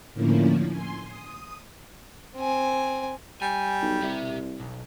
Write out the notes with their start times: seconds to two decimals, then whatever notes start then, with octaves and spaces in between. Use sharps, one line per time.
0.14 A2 D3 F3 A#3 C#4 E4
0.69 G#5 C6
1.05 D#6
2.37 C4 G#5
3.42 G3 G#5
3.82 B1
4.03 C2 G4 E5
4.60 B1